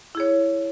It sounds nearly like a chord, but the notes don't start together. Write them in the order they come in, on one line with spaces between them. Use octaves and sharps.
E4 G#4 C#5